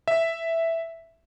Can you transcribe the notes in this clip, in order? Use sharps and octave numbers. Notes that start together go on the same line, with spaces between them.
E5